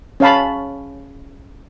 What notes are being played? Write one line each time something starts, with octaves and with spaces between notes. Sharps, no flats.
C#4 C#5 F5 A5 B5